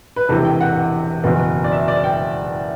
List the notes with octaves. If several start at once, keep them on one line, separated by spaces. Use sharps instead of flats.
B4
E1 E2 C3 E3 A4
G5
F#5
F#5
F#1 E2 B2
D5
E5
D5
G5